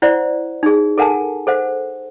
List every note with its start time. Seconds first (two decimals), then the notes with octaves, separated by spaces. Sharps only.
0.02 E4 C5 D5 F#5
0.63 D#4 G#4
0.98 A4 A#4 F#5 G#5 A5
1.47 A4 C5 F#5